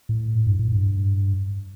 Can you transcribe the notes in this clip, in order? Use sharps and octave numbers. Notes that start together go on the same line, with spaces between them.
A2
G2
A2
G2